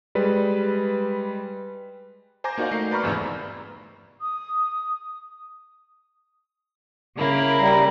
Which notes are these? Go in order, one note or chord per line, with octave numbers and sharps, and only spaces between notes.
G3 G#3 B4
C5 G#5 A#5 D6 G6 A#6
A#3 D#4 F#4 A#4 D5 F5
A3 G6 C7
B4 D5 A#5 B5 C#6 F6
G1 E2 G#2 C3 E3 E6
D#6
C#3 A#3 E4
G3 A#5